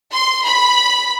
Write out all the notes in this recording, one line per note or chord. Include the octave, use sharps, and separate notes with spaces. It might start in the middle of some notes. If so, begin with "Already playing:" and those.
C6
B5